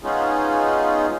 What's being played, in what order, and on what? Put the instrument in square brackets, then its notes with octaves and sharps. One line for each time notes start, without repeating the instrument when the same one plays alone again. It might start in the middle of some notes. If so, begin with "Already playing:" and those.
[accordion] G#3 B3 C#4 D#4 F4 G#4